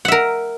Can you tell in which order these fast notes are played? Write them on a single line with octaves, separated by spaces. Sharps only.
F#5 E5 A#4